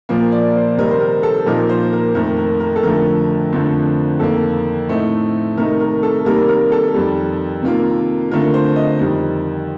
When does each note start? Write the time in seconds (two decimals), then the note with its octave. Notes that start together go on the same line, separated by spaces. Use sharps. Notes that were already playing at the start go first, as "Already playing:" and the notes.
0.09 A#2 F3 A#3
0.32 D5
0.56 C5
0.77 C3 D#3 G3 C4 D#4 A#4
0.91 C5
1.01 A#4
1.23 A4
1.46 A#2 F3 A#3 D#4 A#4
1.69 C5
1.93 A#4
2.15 F2 D#3 A3 A#4
2.38 A#4
2.60 A#4
2.76 A4
2.83 F2 D3 F3 A3 A#4
3.52 F2 D3 F3 A3 C4
4.20 F2 D#3 A#3 A4
4.89 A2 A3 C4 D#4
5.57 C3 D#3 A3 D#4 A#4
5.80 A#4
6.03 A4
6.25 C3 D#3 G3 A#3 A#4
6.49 A#4
6.72 A4
6.94 F2 D#3 G3
7.62 C3 D#3 A#3 F4
8.31 D3 A3 C4 F4 A#4
8.54 C5
8.76 D#5
8.99 F2 D#3 G3